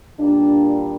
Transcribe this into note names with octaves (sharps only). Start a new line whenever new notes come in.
A#2 G3 A#3 D4